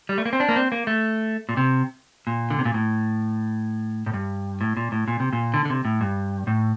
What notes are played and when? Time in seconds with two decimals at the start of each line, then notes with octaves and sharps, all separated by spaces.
0.09 G3
0.18 A3
0.26 A#3
0.33 C4
0.40 D4
0.49 A#3
0.56 C4
0.72 A#3
0.87 A3
1.49 A#2
1.57 C3
2.27 A#2
2.50 D3
2.59 C3
2.65 A#2
2.74 A2
4.06 A2
4.14 G2
4.61 A2
4.77 A#2
4.92 A2
5.08 A#2
5.20 C3
5.33 A#2
5.54 D3
5.65 D3
5.70 C3
5.85 A2
6.01 G2
6.47 A2